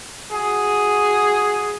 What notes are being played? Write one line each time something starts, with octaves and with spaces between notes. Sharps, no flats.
F#4 G#4